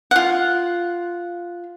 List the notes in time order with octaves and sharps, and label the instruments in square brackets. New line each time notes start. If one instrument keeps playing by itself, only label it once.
[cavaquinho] F4 F#5